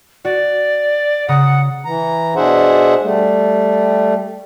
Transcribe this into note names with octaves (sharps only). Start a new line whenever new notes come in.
F#4 D5
C#3 F#5 A#5 D#6
E3 A#5
B2 D4 G#4 C5 E5 F#5
G3 A3